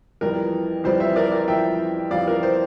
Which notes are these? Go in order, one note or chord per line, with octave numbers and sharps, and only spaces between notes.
F2 E3 G3 A#4
F2 E3 G3 C5
C5 E5
A#4 D5
A#4 D5
F2 E3 G3 E5 G5
F2 E3 G3 D5 F5
A#4
C5